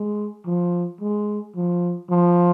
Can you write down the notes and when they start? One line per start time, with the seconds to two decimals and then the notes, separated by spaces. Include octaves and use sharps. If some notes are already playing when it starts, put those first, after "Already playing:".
Already playing: G#3
0.46 F3
1.01 G#3
1.56 F3
2.10 F3